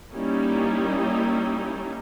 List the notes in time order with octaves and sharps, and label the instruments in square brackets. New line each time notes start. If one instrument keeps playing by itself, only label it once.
[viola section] G3 A#3 C#4 D#4 E4